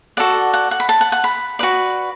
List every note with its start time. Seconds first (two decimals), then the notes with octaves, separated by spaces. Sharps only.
0.17 F#4 A4 D5 F#5
0.54 F#5
0.71 F#5
0.80 B5
0.89 A5
1.01 F#5
1.12 F#5
1.24 B5
1.59 F#4 B4 D5